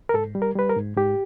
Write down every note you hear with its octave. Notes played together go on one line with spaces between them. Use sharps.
A#4
G#2 A4
G3
A#4
G3 B4
A#4
G#2
G#2 G4